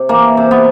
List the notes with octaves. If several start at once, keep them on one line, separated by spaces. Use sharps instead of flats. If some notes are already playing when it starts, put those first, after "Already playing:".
Already playing: C3
E3 A#3
C3
B3